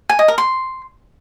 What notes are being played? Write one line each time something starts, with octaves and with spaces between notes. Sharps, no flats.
G#5
D#5
A#4
C6